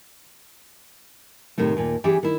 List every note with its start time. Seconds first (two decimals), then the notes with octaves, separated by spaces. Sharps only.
1.58 A2 C3 D#3 A3
1.77 D#2 A#2
2.04 E3 C#4 E4 G4 G#4 D5
2.23 D#3 E4